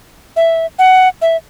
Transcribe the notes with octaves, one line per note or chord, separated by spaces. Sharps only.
E5
F#5
E5